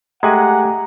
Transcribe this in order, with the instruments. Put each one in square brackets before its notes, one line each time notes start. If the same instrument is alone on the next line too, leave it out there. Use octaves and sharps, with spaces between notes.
[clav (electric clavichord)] G#3 [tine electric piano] A3 G4 G#5 [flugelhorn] F#5 [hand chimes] A#5